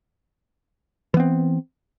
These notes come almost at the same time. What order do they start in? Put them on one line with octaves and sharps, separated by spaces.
E3 B3 C4